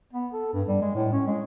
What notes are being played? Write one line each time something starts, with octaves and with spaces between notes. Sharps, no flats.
B3
A4
G2
G3
G#3
A2
C#4
G#3